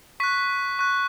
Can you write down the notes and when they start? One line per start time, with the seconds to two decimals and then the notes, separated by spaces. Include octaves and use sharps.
0.20 C#6 F#6 B6
0.79 C#6 F#6